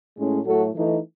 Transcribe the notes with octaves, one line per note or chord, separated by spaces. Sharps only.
A2 G#3 C#4
A2 F#3 A3 F#4 A4
E3 A3 D#4